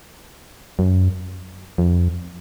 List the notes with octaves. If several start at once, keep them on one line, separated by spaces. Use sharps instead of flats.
F#2
F2